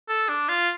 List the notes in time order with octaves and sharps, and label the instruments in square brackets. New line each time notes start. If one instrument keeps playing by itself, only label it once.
[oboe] A4
D4
F4